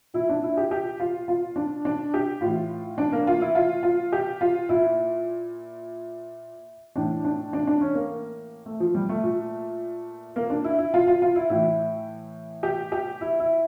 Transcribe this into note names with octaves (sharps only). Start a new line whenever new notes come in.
A#2 E4
D4
E4
G4
G4
F4
F4
D4
D4
G4
A2 E3 F4
D4
A#3
F4
E4
F4
F4
G4
F4
A#2 E4
A2 E3 D4
D4
D4
D4
C#4
A#3
A3
F3
G3
A3
A#2
A#3
D4
E4
E4
F4
F4
F4
E4
A2 E3 E4
G4
G4
E4
E4